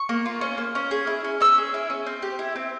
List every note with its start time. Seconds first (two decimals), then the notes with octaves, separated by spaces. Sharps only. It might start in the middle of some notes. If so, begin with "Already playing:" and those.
Already playing: C#6
0.09 A#3
0.26 F4
0.41 C#4
0.58 A#3
0.75 C#4
0.91 G#4
1.07 E4
1.24 C#4
1.41 C#4 E6
1.58 G#4
1.74 E4
1.90 C#4
2.06 C4
2.22 G4
2.39 E4
2.56 C4